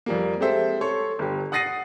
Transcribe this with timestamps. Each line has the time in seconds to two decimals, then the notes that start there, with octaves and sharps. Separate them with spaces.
0.06 F2 G3 A#3
0.40 G#3 C4 G4 A4 C5 E5
0.81 A4 C#5 C6
1.19 G1 G4
1.52 F#5 D#6 A6 A#6 C7 D#7